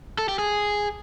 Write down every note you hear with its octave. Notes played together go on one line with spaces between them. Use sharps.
A4
G4
G#4